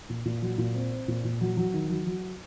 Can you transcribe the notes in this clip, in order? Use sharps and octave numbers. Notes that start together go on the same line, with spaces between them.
A#2
A#2
F#3
A#2
C4
C4
A#2
A#2
F#3
F#3
D#3
F#3
F#3